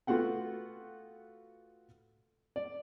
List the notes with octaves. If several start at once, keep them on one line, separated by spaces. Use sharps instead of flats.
A3 B3 F4 F#4 F#5 G5
D5